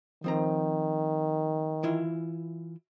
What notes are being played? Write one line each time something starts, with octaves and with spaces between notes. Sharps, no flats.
D#3 F3 C4 A#5
E3 E4 F4